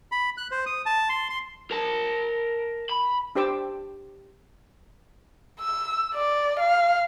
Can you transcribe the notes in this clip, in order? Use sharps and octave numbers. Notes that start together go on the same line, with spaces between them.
B5
F#6
C5
D#6
A5
C6
C6
A#4 A5
B5
D4 G4 C5 D6 E6
E6
D5
F5